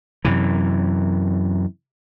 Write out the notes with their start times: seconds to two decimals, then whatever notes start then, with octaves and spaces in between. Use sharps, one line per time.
0.25 F#2 C3 E3